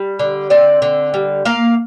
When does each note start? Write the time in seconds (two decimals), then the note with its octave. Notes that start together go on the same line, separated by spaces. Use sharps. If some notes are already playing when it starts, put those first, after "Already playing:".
Already playing: G3
0.19 D3
0.50 C4 D5
0.82 D3
1.14 G3
1.45 A#3 F5